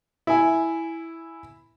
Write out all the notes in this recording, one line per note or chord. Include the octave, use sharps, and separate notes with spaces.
E4 G#5